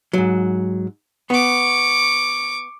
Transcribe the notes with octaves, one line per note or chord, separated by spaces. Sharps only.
G#2 F#3
B3 C#6 D6